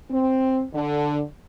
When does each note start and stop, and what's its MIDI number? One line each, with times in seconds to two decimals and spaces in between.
0.11 0.62 60
0.73 1.20 50